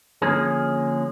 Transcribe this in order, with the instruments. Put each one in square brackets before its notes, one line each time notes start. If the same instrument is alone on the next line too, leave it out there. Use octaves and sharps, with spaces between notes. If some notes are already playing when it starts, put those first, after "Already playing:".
[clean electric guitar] D3 F3 G#3 A#3 C#4 G#4